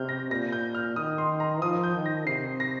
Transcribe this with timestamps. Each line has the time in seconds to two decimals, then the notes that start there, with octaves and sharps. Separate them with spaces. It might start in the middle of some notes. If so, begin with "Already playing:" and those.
Already playing: C3 F6 G6
0.09 A#6
0.30 A#2 A#6
0.52 G6
0.75 F6
0.96 D#3 D#6
1.18 C6
1.40 A#5
1.61 F3 D#6
1.83 G6
1.95 D#3
2.06 A#6
2.27 C3 C7
2.60 A#6